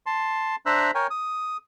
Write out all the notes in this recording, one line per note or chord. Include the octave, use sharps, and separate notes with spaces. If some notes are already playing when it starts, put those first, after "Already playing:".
A5 C6
D4 C5 E5 A#5 E6 F#6
A#4 C#5 G5 G#5
D#6